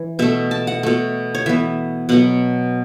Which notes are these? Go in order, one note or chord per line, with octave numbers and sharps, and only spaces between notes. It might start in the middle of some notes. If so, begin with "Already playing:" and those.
Already playing: E3
B2 A3 E5
A5
F#5
B2 A3
C#5
E3 B3 E5
B2 F#3 B3 F#5